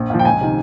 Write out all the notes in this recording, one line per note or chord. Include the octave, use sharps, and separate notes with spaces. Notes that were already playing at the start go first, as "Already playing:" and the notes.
Already playing: A#1
A#2 F3
G5
C#2 G#5
C3 D#3